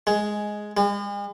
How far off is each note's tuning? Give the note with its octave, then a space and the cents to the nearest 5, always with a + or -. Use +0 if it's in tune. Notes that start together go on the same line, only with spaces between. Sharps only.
G#3 +5
G#3 -45